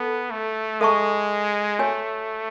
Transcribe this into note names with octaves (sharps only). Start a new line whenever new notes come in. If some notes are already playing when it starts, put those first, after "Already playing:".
Already playing: B3 A4 A5
A3
G#3 A4 E5 A5 C#6
A3 F#4 C#5 G#5